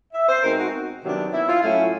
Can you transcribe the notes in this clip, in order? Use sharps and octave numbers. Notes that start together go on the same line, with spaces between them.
E5
C5
B2 G#3 C4 D#4 A#4
F#4
C3 D#3 F#3 B3 D4
E4
F4
A2 F#3 A3 C#4 E4